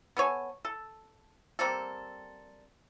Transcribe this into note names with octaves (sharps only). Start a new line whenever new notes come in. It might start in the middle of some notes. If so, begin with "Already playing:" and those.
B3 A4 C#5 G#5
A4
G3 A#3 C4 A4